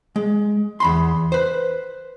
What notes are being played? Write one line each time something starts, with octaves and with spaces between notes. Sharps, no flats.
G#3
E2 B5 C6
B4 C5